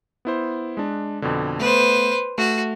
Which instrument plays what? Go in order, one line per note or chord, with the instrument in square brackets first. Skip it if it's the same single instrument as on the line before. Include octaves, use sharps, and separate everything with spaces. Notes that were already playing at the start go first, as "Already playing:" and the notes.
[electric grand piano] B3 E4 C5
G#3 D4
F2 B2 D3
[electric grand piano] A3 B3 [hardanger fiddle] B4 C5
[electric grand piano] A3 [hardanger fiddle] F#4